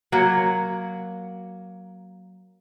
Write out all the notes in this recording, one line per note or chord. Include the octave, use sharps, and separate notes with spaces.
F#3 A#3 F#5